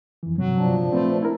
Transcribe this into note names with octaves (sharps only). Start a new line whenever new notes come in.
F2 E3
G2 C3 F#3
A#2 F3 D4
A3 C4 B4 C5
E4 A#4